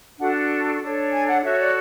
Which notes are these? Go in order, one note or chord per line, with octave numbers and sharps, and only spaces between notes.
D4 F#4 A4 F#5
D4 A4 C#5
G#5
F#5
F#4 A4 C#5 E5
D5